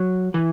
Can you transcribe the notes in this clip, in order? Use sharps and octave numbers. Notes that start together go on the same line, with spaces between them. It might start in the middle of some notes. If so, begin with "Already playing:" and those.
Already playing: F#3
E3